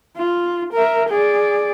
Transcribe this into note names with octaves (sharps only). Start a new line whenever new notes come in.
F4
A#4 E5
G#4 D5